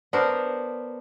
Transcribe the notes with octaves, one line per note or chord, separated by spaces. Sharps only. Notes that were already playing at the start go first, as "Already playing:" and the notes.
B3 D4 A#4 C5